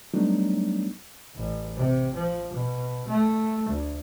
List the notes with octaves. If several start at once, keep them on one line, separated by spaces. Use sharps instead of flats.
F#3 G3 A3 B3 D4 D#4
A1
C3
F3
B2
A3
D2